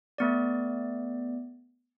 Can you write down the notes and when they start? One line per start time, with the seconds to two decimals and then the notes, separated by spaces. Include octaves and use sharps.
0.18 A3 B3 D5